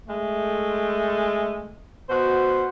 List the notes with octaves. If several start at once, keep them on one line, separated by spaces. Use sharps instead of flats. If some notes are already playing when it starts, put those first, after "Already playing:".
G#3 A3
B2 F#4 C5